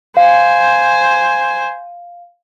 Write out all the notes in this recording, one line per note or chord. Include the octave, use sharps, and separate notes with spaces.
C5 F5 G#5